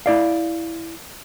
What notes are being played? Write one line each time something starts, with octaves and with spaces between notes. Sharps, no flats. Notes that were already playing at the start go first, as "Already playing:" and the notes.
E4 D5 F5